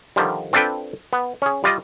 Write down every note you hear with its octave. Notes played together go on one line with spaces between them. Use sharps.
D3 D#3 F3 G3
C4 D4 F4 A4 B4 G5
B3
C#4 G#4
G3 F4 D5 D#5